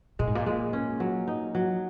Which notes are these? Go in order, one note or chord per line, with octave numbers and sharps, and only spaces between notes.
A#2 G#3
G#2
A#2
G#3
C#4
F#3
D#4
F#3